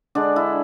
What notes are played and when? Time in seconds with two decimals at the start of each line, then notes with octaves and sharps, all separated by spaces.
0.15 D3 G#3 D4
0.36 E4